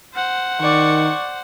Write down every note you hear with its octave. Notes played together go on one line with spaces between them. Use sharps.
C5 F#5
D#3 D5 C#6